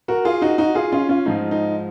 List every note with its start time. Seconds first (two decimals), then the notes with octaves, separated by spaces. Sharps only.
0.08 F#4 A#4
0.25 F4 G#4
0.42 D#4 F#4
0.58 D#4 F#4
0.75 F4 G#4
0.92 C#4 F4
1.09 C#4 F4
1.26 G#2 F3 D#4
1.51 D#4